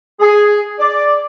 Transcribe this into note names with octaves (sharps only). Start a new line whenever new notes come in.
G#4
D5